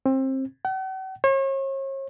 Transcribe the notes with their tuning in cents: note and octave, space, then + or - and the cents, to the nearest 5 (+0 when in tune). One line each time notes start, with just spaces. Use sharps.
C4 +25
F#5 +45
C#5 -40